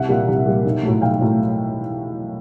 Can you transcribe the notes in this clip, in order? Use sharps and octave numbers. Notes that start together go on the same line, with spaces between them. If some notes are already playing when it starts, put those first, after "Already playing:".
Already playing: C2 E5 F#5
A#2 G3 A#3
C2
A#2 G3 A#3
B1
A2 F#3 A3
B1 F5 G5
A2 F#3 A3